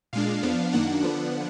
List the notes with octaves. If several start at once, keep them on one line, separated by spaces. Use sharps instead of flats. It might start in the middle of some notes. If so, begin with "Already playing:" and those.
A#2 G#3 D4 F5
F2 F3 B3 D4
F#2 D#3 A#3 D4 F#5
D3 F3 B3 D4